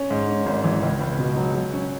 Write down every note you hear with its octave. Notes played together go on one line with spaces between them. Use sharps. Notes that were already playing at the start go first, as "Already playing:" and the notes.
Already playing: C#4
G#2
C#4
G#1
E3
C#2
C#2
B2
F#3
F#3
C#4